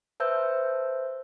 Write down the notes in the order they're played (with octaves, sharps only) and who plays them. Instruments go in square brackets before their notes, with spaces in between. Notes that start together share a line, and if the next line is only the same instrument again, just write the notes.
[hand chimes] B4 C5 E5 A5 E6 G6